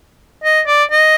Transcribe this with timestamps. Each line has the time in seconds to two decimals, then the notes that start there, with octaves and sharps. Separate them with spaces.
0.44 D#5
0.67 D5
0.91 D#5